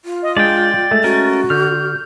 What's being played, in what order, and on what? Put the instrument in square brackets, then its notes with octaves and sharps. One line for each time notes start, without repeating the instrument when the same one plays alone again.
[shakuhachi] F4
[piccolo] D#5
[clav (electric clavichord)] G#3 D4 [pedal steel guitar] D5 G5 [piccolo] A6
[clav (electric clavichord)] G#3 A3
[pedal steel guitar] C#4 A#4 [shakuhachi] F#4
[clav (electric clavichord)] D3 [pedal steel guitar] F6 [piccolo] G6